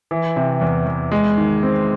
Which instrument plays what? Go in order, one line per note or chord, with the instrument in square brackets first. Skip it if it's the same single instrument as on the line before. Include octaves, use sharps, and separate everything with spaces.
[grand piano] E3
C3
E2
E2
G#3
D#3
C4